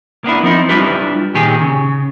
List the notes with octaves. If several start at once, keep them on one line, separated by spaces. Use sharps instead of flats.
A#3 B3 D4 E4
F3 C4 D#4 E4
G3 D4 E4 F4 G4 B4
A#2 D#3 G4 G#4
C#3